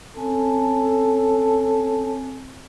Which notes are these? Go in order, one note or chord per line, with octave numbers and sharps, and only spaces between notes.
C4 C#4 A4 G#5